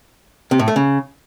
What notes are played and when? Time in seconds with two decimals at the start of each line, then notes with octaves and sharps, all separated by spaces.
0.51 C3
0.59 A2
0.68 A3
0.76 C#3